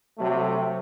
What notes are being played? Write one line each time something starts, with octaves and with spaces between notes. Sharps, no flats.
C3 F#3 A3